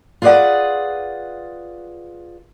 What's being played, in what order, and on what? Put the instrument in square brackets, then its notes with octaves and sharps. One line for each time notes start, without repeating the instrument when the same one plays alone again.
[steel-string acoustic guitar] F4 G#4 B4 C#5 D5 F#5